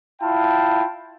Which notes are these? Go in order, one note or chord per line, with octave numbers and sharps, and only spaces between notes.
E4 F4 F5 G5 A5